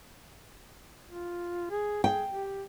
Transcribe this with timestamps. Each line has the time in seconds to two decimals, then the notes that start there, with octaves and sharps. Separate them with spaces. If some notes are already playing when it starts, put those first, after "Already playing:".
1.06 F4
1.70 G#4
2.04 G#4 G5
2.31 G4